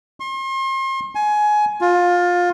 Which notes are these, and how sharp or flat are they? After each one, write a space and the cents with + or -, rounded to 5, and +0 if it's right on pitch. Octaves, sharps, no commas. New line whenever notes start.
C6 +40
G#5 +20
F4 +20